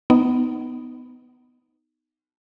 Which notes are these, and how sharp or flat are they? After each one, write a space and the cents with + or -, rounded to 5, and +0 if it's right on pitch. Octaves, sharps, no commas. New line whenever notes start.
B3 +15 D#4 +0